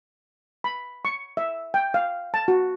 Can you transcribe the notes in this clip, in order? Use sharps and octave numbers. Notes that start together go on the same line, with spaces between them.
B5
C#6
E5
G5
F5
A5
F#4